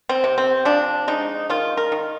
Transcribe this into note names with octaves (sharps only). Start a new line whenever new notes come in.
C4
C3
C4
F3 D4
G#3 D#4
D#3 F4
A#4
D#3